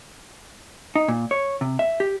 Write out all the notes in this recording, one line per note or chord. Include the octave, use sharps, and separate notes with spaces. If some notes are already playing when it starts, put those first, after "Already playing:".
D#4
A#2
C#5
C3
E5
G4